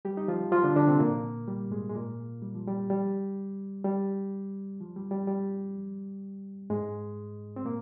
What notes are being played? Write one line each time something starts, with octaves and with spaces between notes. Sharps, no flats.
G3 G4
D#4
F3 F4
F3 F4
D3 D4
D3 D4
C3 C4
A#2 A#3
G3
G#2 G#3
G#3
A#2 A#3
G3
F3
G3
G3
G3
F3
G3
G3
G3
G#2 G#3
C4
A#2 A#3